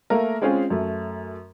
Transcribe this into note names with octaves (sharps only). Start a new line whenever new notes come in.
A3 A#3 A#4
G#3 C4 C#4 F4 G#4
F#2 A3